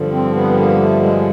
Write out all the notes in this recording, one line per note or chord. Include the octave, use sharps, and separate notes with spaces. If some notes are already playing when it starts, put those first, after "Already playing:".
Already playing: G2 D3 F3
C4
B3
A#3
A3
G#3